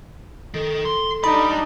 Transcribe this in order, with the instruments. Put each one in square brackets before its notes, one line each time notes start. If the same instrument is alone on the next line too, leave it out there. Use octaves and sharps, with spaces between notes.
[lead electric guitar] D#3 [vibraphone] A4
[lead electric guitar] C6
[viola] D4 D#4 [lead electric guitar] G4 D5 [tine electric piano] B5